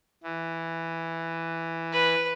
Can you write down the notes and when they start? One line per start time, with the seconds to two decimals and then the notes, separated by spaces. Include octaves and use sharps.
0.24 E3
1.93 B4